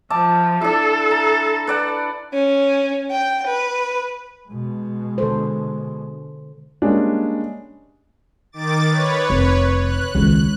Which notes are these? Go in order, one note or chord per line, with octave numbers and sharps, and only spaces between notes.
F3 E5 A5 D6
D4 E4 A4
A#5
B4 D5 F#5
C#4
G5
B4
B2 G#3
D3 A4 C5
G3 G#3 A#3 C#4 D4
D#3 D6 A6
B4 C#5
F1
F#6
C#2 D#3